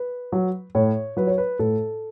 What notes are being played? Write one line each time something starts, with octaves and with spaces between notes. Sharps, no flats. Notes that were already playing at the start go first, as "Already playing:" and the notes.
Already playing: B4
F#3
A2 C#5
F#3 B4
C#5
B4
A2 A4